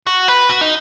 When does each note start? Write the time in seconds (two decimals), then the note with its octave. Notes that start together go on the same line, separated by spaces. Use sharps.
0.07 F#4
0.28 B4
0.49 F#4
0.61 D#4